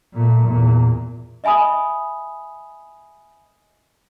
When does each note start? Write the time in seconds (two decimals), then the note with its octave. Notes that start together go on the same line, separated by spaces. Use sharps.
0.13 A#2 A3
0.46 E2 A#2
1.44 D#5 E5 G#5 B5 D#6